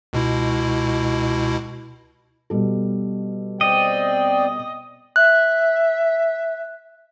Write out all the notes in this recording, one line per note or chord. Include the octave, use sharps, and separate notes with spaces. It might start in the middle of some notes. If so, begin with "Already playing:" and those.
C#2 B2 E4
B2 G3 A4
C4 D5 D#5 G5
E5 F#6